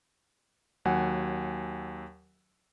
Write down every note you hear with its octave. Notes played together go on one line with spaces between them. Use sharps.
D#2 F#3 F#5 G#5